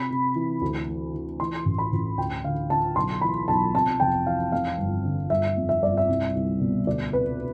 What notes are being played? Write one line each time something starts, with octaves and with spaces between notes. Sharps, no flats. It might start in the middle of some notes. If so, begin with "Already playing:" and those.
Already playing: C3 B5
C3
E3
D2
E3
E3
E3 C6
A1
B5
A1
D2 G5
D3 F5
D3 A5
B1 C6
E3 B5
B1 A5
C3 A5
F1 G5
E3 F5
F2 F5
G1
D3
G1 E5
F2
E5
G1 D5
E5
C2
C2
B2
D2 D5
C3 B4